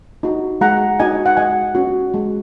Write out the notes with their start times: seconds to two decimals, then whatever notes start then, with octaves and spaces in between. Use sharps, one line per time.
0.23 D#4 F#4
0.61 G#3 F#5 A#5
1.00 D#4 F#4 D#5 G#5
1.26 F#5
1.37 G#3 D#5 G#5
1.75 C#4 F#4
2.14 G#3